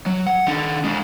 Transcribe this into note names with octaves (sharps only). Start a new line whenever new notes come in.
F#3
F#5
D#3 D4
G#3 D4